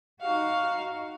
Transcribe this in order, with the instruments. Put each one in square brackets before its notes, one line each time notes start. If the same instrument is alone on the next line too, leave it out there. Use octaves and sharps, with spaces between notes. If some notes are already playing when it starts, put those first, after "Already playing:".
[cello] D#4 F#4 [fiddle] F5